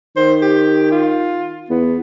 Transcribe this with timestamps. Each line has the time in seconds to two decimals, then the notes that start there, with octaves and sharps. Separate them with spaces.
0.16 D#3 C5
0.42 G4
0.91 F4
1.70 E2 B3